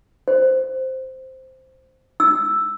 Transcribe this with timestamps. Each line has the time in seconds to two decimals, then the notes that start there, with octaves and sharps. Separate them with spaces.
0.28 C5
2.20 E6